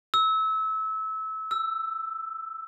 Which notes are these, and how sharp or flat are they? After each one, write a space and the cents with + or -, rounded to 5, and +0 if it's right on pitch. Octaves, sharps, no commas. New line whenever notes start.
E6 -25
E6 +10